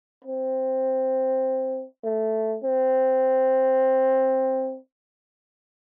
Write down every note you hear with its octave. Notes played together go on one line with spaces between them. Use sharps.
C4
A3
C4